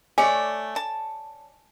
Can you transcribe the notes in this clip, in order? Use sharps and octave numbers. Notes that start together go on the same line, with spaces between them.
A3 C#5 D5 G#5
A5